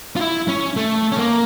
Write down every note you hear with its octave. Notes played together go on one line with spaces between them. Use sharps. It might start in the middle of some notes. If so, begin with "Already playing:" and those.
F4
E4
C#4
A3
C#4
A#3